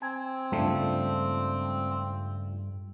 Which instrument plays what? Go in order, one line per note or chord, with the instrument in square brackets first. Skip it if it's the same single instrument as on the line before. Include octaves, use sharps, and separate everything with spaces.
[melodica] C4 [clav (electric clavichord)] G#5
[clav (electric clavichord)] C#2 F3 A3 [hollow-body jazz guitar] G2 D4